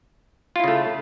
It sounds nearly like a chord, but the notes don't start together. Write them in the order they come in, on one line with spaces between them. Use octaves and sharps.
F4 E4 C#3 A3